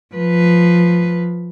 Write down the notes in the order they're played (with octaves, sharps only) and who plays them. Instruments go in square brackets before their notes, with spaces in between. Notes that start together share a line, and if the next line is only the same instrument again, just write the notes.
[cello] F3 B4